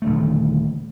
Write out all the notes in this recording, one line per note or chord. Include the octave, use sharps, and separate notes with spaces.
D#1 D3 A3